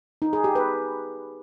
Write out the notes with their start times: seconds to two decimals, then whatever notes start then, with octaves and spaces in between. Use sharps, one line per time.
0.22 D#4
0.33 G#4
0.44 G4
0.55 B4